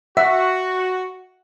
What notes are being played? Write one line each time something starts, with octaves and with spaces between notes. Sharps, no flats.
F#4 E5 F#5